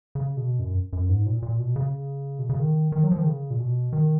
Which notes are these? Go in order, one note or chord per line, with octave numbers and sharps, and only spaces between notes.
C#3
B2
F#2
F#2
G#2
A#2
A#2
B2
C#3
B2
C#3
D#3
D#3
F#3
F3
D#3
C#3
A#2
B2
D#3